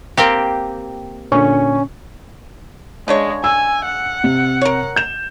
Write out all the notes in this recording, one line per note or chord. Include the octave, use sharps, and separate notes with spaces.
A#3 C4 G4
A#2 D3 C#4 C#6
C#3 G#3 D4 C#5
G#5 E6
F#5
C3
A#4 C#5
G6 E7